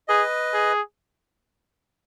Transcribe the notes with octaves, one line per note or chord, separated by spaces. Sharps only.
G#4 B4 D#5
G#4